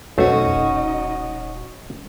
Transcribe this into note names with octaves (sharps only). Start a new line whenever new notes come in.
B1 F2 A3 C#4 D#4 F#4 C5 D#5
D#1